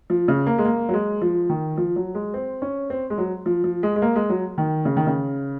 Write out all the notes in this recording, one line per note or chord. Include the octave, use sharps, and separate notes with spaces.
F3
C#3
A#3
G#3
A#3
F#3
G#3
F3
D#3
F3
F#3
G#3
C4
C#4
C4
G#3
F#3
F3
F3
G#3
G#3
A#3
G#3
F#3
D#3
C#3
D#3
C#3